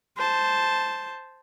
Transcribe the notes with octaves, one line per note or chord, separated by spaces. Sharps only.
C5 A5